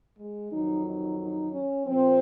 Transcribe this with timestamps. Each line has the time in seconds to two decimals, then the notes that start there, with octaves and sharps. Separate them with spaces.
0.18 G#3
0.51 F2 D#3 F#3 D#4
0.85 D#4
1.19 D#4
1.52 C#4
1.86 A#2 F3 C4